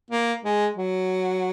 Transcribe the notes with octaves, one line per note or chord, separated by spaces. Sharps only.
A#3
G#3
F#3